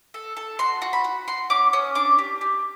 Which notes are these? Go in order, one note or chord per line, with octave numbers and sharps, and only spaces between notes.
A4
A4
F#4 C6
F#4
B5
F#4
F#4 C6
C#4 D6
C#4 D#6
D4 D6
G4
G4